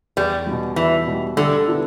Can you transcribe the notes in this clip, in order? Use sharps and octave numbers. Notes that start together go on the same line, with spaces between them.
E2 G3
B2 G3
E2 E3
B2 G3
D3 G3
B3 E4 A4